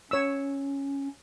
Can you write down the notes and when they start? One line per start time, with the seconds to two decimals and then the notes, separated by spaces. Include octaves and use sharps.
0.11 C#4 C#5 E6